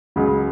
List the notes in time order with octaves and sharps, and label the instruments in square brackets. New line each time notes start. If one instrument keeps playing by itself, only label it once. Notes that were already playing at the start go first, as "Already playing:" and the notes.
[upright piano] C#2 C#3 F#3